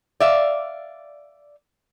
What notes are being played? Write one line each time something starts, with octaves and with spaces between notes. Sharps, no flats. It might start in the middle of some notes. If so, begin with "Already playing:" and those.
D5 E5 F5